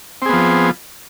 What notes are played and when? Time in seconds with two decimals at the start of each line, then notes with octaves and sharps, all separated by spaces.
0.22 C4
0.26 G#4
0.29 B3
0.33 F3